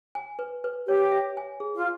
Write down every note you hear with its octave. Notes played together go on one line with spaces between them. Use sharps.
G#5
B4
B4
G4 C#5
E5
G#5
G#4
F4